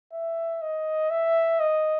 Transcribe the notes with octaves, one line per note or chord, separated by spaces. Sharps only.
E5
D#5
E5
D#5